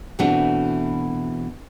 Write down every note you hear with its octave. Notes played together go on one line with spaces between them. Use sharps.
B2 E3 A3 C4 D4 F#4